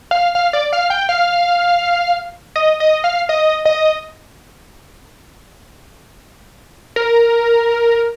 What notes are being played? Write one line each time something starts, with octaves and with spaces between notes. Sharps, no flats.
F5
F5
D5
F5
G5
F5
D#5
D#5
F5
D#5
D#5
A#4